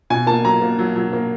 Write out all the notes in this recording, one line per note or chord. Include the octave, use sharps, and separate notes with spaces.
B2 G#5
A#3 A5
F#3 A#5
A#3
F#3
F#3
A#3